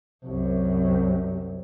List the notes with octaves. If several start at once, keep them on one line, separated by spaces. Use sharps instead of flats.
C2 F#2